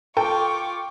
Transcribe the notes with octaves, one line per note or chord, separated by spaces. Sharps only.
F4 A4 G5 C#6 D6